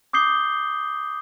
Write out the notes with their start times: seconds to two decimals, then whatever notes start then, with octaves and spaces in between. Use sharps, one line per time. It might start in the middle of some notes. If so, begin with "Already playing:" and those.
0.13 D6 D#6 G6 C7 G7